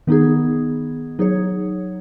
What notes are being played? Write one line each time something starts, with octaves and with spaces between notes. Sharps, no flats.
D#3 B3 D#4 G#4
F#3 D#4 G#4 C#5